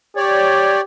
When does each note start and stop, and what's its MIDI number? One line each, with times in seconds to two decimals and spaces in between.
0.17 0.82 67
0.17 0.81 73
0.17 0.81 74